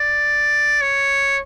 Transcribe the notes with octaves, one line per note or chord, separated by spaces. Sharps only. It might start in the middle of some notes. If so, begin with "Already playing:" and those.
Already playing: D5
C#5